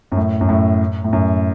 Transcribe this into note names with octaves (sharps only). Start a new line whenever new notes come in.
F#2
A2
F#2
A2
A2
F#2